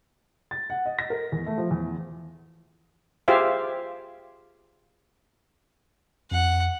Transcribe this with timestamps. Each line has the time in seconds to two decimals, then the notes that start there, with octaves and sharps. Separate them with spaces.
0.51 A6
0.70 F#5
0.86 D#5
0.99 A#6
1.10 A#4
1.32 E2
1.46 A3
1.58 F3
1.71 E2
3.28 F4 G4 G#4 C5 E5 F5
6.31 F2 F#5